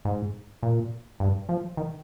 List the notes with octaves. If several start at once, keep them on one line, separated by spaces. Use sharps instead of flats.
G#2
A#2
G2
F3
D#3